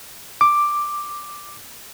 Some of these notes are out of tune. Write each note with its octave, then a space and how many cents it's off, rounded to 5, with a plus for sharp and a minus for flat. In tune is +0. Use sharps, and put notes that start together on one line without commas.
D6 +5